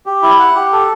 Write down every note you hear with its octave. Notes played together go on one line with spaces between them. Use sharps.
G4
E4
F#5
G4
A4